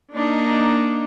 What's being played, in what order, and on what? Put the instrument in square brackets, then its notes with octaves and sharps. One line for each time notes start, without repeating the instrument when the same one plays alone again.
[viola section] A#3 D4 D#4